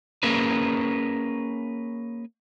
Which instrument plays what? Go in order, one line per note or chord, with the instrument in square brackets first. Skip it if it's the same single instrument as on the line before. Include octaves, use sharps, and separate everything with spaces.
[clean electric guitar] A#3 C#4 G#4 A#4 B4